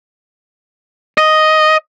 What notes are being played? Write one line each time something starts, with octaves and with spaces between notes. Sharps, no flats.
D#5